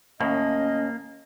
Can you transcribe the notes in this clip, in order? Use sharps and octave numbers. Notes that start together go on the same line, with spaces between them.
D#2 A2 A#3 C#4 D#5